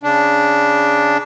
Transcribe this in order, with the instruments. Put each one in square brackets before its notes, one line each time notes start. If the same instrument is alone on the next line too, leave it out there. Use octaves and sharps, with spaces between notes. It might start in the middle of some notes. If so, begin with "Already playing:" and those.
[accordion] C#3 D4